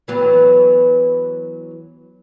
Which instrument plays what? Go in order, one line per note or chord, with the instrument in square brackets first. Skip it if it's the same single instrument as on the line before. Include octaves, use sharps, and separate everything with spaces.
[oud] E3 F#3 B3